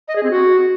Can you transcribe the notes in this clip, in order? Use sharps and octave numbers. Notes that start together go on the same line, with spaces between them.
D#5
G#4
C4
F#4